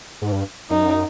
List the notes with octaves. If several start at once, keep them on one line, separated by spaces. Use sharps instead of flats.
G#2
G2
F#2 D#4